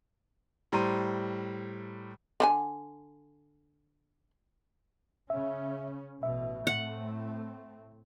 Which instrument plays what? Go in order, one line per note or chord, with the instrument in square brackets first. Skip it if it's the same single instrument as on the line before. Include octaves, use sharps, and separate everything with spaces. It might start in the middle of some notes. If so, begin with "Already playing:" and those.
[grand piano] A2 G3 C5 A#5 C6 D#7
[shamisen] D3 E4 G#5
[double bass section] C#3 C#4 [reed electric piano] E5
[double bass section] A1 B2 [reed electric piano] E5
[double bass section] A2 A3 C4 [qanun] F#5